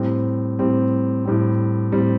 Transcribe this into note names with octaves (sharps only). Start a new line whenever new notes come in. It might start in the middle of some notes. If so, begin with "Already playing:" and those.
Already playing: A2 G3 C4
A2 G3 C4
A2 G3 C4
A2 G3 C4